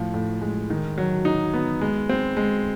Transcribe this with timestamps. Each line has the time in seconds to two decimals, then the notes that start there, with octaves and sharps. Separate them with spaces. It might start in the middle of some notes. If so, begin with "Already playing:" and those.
Already playing: A2 F3
0.14 A2
0.41 G#3
0.70 D#3
0.98 F#3
1.25 D#4
1.54 B3
1.81 G#3
2.09 C4
2.37 G#3